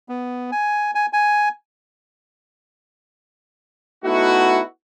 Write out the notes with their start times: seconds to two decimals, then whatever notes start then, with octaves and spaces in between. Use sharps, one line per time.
0.09 B3
0.52 G#5
0.95 G#5
1.13 G#5
4.04 A3 B3 D#4 E4 F#4